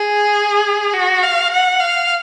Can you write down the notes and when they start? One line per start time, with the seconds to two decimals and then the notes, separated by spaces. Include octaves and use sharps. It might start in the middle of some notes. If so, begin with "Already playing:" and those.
Already playing: G#4
0.94 F#4
1.23 F5
1.51 F#5
1.80 F5